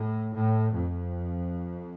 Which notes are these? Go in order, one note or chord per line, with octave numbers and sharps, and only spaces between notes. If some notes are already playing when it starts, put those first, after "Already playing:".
Already playing: A2
A2
F2